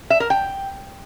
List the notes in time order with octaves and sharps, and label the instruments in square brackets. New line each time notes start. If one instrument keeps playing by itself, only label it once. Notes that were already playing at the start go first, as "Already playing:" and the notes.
[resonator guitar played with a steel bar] E5
A#4
G5